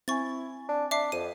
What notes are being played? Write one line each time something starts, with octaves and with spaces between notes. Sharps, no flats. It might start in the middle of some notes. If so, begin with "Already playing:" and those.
C4 E4 G#5 C#6 A6
D4
D4 E5 D6 C7
F2 D#7